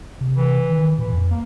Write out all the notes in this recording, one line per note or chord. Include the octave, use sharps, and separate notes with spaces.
C3
E3
D#3
A#2 E3
F2
A#3